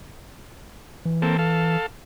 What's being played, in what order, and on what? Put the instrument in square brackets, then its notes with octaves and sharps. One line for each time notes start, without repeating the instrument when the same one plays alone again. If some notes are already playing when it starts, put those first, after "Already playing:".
[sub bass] E3
[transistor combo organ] A#3 C4 A4
A4 F5